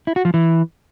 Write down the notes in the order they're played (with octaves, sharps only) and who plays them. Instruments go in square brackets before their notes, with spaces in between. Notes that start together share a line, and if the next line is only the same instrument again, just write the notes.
[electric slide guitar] E4
F#4
F3
E3